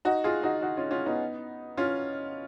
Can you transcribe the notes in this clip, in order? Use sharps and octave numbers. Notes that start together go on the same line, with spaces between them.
D#4 F#4
F4 G#4
D#4 F#4
D#4 F#4
C#4 F4
C#4 F4
B3 D#4
C#4 F4